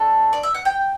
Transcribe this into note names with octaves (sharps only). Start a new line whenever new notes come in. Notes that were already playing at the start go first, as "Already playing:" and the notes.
Already playing: A3 D4 A4
D5
E5
F#5
G5